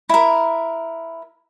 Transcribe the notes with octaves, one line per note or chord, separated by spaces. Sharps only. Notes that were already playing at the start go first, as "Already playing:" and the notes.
E4 A#4